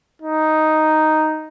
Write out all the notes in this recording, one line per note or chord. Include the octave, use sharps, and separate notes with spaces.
D#4